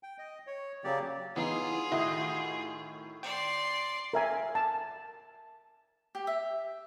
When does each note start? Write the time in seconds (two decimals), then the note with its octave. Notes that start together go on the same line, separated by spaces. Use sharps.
0.03 G5
0.19 D#5
0.47 C#5
0.84 C#3 F#3 A#3 G4 D5
1.36 E3 B3 D#4 F4 G#4
1.92 A2 D#3 E4 F#4 D#5 E5 D#6
3.23 D5 G5 C6
4.13 A#4 E5 G#5
4.55 A5
6.15 G4
6.27 E5